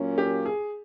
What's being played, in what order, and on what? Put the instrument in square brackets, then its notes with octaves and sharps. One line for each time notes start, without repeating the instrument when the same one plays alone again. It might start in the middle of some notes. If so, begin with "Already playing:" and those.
Already playing: [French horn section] A#2 F#3 A#3 C#4
[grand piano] G4
G#4